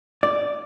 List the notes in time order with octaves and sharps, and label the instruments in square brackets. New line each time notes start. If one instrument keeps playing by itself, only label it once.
[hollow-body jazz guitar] D5